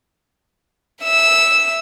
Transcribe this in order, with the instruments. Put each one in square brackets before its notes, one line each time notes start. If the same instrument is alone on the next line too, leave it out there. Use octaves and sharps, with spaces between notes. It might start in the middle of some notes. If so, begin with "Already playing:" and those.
[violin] E5 E6